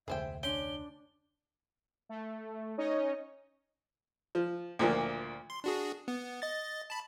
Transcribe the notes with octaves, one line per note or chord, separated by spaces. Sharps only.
F1 D2 G#4 C5 E5 G5
C#4 D4 G5 C6
A3
C#4 D#4 C#5 D#5
F3
D2 A#2 F3 A#3
C6
D4 F#4 G#4
B3
D#5 A6
A5 B5